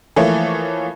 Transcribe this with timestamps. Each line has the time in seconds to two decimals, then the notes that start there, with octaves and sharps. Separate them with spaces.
0.16 E3 F3 A3 A#3 C#5